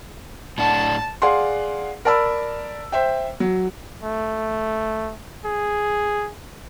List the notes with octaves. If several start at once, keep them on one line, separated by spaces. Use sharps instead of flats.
A2 D4 F#5 A5
G#4 D5 F5 F#5 C6
A#4 D5 A5 B5 E6
C5 E5 G5
F#3
A3
G#4